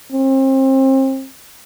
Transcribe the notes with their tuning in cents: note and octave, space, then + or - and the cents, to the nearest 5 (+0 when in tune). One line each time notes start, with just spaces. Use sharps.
C4 +35